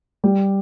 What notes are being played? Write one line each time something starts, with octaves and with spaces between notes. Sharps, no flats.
G3 G4